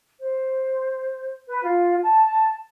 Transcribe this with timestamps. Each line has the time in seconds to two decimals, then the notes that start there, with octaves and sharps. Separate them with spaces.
0.20 C5
1.48 B4
1.62 F4
2.01 A5